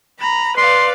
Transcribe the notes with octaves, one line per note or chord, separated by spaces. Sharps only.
A#5 B5
B4 D5 F5 C6